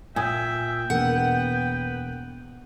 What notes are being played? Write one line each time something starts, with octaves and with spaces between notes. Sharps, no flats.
A#2 E5 G5 G#5 D#6 G#6
E1 A#3 B3 B4 F#5